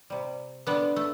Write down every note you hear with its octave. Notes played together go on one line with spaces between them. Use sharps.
C3 G3
D3 G3 B3 D4
A3